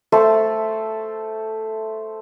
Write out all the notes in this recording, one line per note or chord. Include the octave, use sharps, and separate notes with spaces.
A3 C5 A5